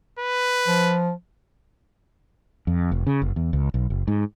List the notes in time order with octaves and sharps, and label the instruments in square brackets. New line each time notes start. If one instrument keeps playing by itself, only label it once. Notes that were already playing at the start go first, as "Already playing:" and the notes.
[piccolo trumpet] B4
[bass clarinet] F3
[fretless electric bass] F2
F1
C#3
F#1
E2
C#2
B1
F#1
G#2